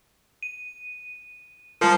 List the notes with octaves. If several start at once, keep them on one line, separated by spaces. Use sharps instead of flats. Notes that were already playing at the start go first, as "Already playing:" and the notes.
D#7
F3 G3 A#4